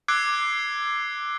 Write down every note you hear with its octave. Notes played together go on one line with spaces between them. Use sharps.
D6 E6 F#6 G#6 C7 D7